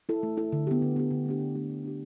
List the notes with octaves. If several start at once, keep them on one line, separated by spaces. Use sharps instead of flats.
E4 A4
A3
E4 A4
D3
B3 G4
D3
B3 G4
D3
A3 D4 G4
D3
A3 D4 G4
A3
D4 G4